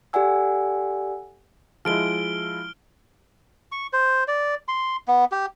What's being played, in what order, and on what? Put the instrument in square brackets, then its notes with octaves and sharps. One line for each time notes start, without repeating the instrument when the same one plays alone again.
[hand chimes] G4 A4 D5 F#5 G#5 E6
[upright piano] F3 G#3 E4 [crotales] F6 D7 G7
[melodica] C#6
C5
D5
C6
B3
G4